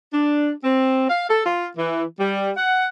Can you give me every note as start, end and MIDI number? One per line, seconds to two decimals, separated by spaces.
0.13 0.51 62
0.64 1.07 60
1.10 1.28 77
1.30 1.44 69
1.45 1.66 65
1.77 2.04 52
2.19 2.52 55
2.57 2.88 78